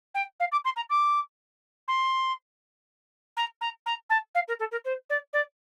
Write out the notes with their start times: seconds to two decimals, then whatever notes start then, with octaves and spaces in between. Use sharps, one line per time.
0.14 G5
0.40 F5
0.52 D6
0.64 C6
0.76 A#5
0.89 D6
1.88 C6
3.36 A#5
3.61 A#5
3.86 A#5
4.09 A5
4.34 F5
4.48 A#4
4.59 A4
4.71 A#4
4.85 C5
5.09 D5
5.33 D5